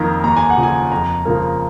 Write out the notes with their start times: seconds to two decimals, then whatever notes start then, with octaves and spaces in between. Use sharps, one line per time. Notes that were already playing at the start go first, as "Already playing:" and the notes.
Already playing: F2 D#3 A#3 A#5
0.24 D#2 A#5
0.37 G#5
0.50 F#5
0.58 C#3 F3
0.63 G#5
0.92 F2 A#5
1.25 C#3 F3 A#3